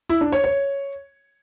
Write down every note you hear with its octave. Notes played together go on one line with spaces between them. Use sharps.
E4
D4
C#5
C#5